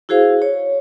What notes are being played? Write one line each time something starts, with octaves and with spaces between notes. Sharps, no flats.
E4 F#4 G#4 C5 F5
C#5